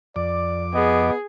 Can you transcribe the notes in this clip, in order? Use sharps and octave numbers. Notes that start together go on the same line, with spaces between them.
F2 D5 D6
B3 G#4 D#5